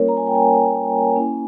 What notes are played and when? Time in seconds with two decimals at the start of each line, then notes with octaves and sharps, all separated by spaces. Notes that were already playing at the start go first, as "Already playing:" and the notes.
Already playing: G3 A#3 C#4 F4 A#4 C#5
0.08 A#5
0.17 G#5
0.27 G5
0.35 G#5
1.16 A#3 C#4 E4